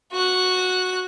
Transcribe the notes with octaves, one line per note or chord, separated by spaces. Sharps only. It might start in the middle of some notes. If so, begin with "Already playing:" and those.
F#4 F#6